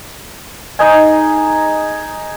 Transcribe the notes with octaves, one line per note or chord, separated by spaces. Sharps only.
D#4 G#4 D#5 G#5